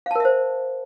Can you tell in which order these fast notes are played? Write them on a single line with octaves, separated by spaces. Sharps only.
F5 A5 A#4 E5 C5